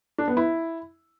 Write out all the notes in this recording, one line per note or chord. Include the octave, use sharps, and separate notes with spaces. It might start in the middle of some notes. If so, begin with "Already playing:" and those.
D4
B3
E4